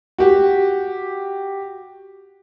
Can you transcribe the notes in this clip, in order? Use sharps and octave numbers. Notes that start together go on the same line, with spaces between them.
F#4 G4